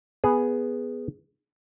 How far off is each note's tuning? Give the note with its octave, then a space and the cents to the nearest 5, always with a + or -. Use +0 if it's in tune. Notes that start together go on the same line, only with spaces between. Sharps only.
B3 +0 G#4 +0